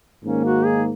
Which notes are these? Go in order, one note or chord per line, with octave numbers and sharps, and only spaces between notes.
G#2 D#3 A#3 C#4
F#4
G#4